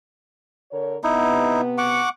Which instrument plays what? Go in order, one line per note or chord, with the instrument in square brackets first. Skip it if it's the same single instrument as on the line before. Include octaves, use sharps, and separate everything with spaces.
[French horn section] D3 A#4 C#5
[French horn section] C3 B3 [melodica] D#4 E4
[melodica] F#5 C#6 D6